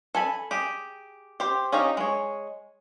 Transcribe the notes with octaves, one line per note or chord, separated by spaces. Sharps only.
A4 G#5 B5
G4 G#4
G4 C5
C#4 D#4 G4 F5
G#3 C#5